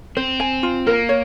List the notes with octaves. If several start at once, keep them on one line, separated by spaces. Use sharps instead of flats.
C4 C5
G#5
F4
A#3 A#4
C#5